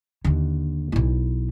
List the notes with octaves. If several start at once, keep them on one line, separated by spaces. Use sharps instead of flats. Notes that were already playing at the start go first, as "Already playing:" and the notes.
D#2 D3
B1 E4